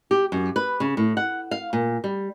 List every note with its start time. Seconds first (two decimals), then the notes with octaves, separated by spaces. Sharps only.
0.11 G4
0.32 F#2
0.56 B4
0.80 C#3
0.97 A2
1.17 F#5
1.51 F5
1.73 A#2
2.04 G3